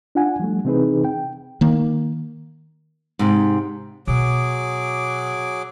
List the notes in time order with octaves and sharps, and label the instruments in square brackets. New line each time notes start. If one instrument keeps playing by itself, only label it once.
[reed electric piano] D4 F4 F#5 G#5
F3 G3 A3
C3 E3 C4 D#4 G#4 B4
G5
[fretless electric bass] D#3 A#3
[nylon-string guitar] G#2 C3
[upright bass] B2 [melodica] F#3 G#4 D6